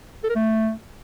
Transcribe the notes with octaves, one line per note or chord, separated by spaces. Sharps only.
A4
A#4
A3